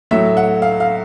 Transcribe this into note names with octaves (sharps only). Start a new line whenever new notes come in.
A2 F#3 A3 E5
F#5
F5
F5